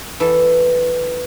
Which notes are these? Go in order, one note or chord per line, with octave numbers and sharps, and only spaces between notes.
E3 A4